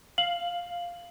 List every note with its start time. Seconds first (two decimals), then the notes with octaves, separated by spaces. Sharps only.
0.18 F5 F#7